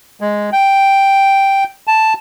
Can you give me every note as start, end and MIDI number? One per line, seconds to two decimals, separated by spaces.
0.21 0.50 56
0.52 1.64 79
1.87 2.14 81